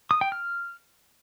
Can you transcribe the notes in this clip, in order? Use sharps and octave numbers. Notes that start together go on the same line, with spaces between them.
D#6
G5
F6